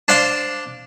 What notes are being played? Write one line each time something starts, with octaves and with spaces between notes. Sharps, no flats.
D4 C5 D5 F5 A5 C6